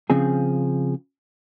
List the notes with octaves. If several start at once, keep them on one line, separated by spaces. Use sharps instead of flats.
C#3 F3 C4 G#4